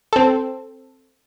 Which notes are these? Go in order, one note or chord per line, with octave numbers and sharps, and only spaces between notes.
C4 A4